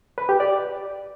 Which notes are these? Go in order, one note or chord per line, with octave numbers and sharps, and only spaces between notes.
B4
G4
D5